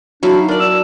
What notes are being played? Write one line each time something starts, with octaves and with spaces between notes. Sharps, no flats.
F#3 D4 E4 F5
D#4
D4 A#4 D5
E6